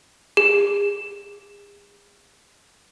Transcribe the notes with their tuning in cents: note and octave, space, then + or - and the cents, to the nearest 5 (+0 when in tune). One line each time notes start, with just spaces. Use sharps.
G#4 -40